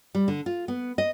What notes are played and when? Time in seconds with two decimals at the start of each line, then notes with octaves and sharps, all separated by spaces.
0.15 G3
0.28 D3
0.46 F4
0.68 B3
0.98 D#5